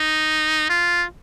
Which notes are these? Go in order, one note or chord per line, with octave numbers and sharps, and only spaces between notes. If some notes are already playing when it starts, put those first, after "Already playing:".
Already playing: D#4
F4